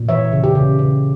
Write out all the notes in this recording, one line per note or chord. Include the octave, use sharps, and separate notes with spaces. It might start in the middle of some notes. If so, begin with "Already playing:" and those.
Already playing: A#2
E3 C#5 E5
C#3
G4
C#3
C#3